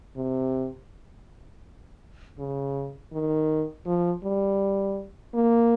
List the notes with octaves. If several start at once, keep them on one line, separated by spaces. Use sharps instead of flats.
C3
C#3
D#3
F3
G3
A#3